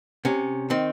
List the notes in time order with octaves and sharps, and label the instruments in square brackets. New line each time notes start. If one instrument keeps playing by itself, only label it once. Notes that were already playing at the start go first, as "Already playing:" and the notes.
[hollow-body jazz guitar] C3 C#4
D#3 C4